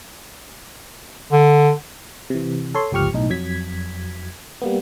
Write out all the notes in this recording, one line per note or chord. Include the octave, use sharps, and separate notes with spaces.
D3
C3 E3
A4 C#5 C6
G1 C#2 F3 G4 C#6 F6
B1 A2 D#4
F2 F#3 G#6 B6
G3 A#3 B3